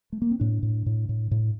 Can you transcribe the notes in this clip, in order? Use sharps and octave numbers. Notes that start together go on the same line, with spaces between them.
A3
A#3
C4
A2 D4
A2
A2
A2
A2